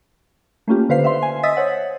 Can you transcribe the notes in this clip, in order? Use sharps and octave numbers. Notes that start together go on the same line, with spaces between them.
A3 A#3 C#4 F4 G4
D3 B4 C5 F5 C7
E5 F5 C6
G#5
D#5 E5 D#6 E6 A6 B6
C5 C#5 F#5